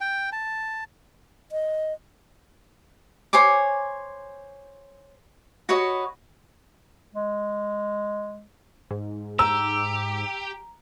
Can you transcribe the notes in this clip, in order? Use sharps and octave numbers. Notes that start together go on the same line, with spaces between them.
G5
A5
D#5
C5 C#5 G#5 D6
F#4 B4 C#5 D#5
G#3
G#2
G4 A#5 E6